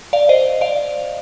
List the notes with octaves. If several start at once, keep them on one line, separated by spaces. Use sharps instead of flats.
D5 F5
C5 D#5
D5 F5